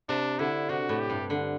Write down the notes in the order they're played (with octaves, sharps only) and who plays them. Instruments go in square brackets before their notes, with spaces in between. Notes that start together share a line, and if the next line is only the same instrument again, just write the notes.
[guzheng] C3 [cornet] D4
[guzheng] D3 [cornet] E4
[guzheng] C3 [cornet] F#4
[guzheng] A2
[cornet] G4
[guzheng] G2
D3